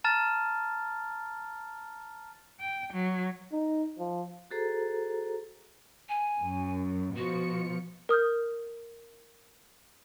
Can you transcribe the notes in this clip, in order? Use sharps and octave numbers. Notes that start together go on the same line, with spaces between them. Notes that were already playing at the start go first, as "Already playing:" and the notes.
A5 A#5 F6 A6
G5
F#3
D#4
F3
F#4 G#4 A4 C5 A#5
G#5
F#2
B2 F3 F#4 C#7
A#4 D#6 F6 G6